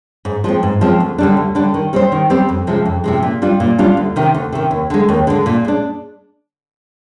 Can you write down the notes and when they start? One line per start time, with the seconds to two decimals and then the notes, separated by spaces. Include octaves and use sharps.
0.25 G#2
0.44 F3 G#3 C4
0.63 G#2
0.81 F3 G#3 C4
1.00 D2
1.18 D3 G3 D4
1.37 D2
1.55 D3 G3 D4
1.74 D#3
1.93 G3 C4 G4 C5
2.12 D#3
2.30 G3 C4 G4 C5
2.49 F2
2.67 C3 F3 G#3
2.85 F2
3.04 C3 F3 G#3
3.23 A#2
3.42 G3 D4 F4
3.60 A#2
3.78 G3 D4 F4
3.97 D2
4.16 C3 D#3
4.35 D2
4.52 C3 D#3
4.71 D#2
4.90 D3 G#3
5.09 D#2
5.27 D3 G#3
5.46 A#2
5.65 G#3 D4